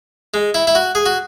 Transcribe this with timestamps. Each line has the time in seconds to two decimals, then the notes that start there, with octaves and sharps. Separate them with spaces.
0.34 G#3
0.54 E4
0.67 E4
0.75 F#4
0.95 G#4
1.06 F#4